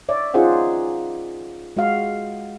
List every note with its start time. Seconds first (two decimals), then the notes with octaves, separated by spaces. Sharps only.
0.09 C#5 D5 E5
0.34 C#4 D#4 F4 G#4 C5 F#5
1.76 G#3 F#4 F5